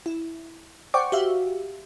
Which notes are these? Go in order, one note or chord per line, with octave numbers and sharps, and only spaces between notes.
E4
C5 D5 F#5 G5 C#6 D6
F#4 G4 E5 F5